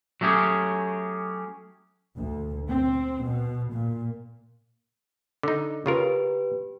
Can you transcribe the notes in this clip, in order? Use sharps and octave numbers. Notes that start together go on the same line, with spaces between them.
F#3 A3 C#4 G4 G#4
D2
C4
B2
A#2
D3 D#4
C#3 F4 G4 A#4 B4